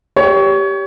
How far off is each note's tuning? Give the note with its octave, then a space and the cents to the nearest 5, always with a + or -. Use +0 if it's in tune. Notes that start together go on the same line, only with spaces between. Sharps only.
G4 +0 C#5 +25